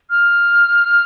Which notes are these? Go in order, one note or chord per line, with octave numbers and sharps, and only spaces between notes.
F6